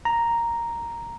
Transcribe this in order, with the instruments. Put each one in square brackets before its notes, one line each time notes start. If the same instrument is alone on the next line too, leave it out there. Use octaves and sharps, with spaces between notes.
[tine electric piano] A#5